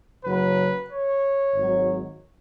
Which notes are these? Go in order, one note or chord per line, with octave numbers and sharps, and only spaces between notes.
F#1 F#2 C#3 F#3 B4
C#5
G#1 G#2 F#3